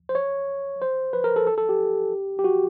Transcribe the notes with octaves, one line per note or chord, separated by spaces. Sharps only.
C5
C#5
C5
B4
A#4
A4
A4
A4
G4
G4
F#4